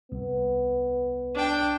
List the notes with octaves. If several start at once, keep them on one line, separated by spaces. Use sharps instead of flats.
C2 B3
D4 G5